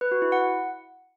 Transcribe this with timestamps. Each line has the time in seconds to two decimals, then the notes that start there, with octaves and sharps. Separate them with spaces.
0.01 B4
0.11 F#4
0.22 E4
0.32 F#5